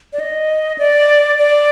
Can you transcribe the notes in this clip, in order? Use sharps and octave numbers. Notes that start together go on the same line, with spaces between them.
D5
D#5
D5
D5